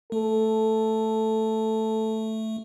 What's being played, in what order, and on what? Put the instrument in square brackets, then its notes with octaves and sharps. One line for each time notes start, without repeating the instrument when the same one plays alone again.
[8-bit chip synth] A3 [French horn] A4